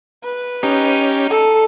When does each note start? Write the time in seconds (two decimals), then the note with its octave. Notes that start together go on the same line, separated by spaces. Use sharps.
0.23 B4
0.63 C#4 D#4 G4 D#5
1.30 A4